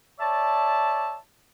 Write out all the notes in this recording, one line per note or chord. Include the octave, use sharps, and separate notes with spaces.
C#5 D5 E5 A5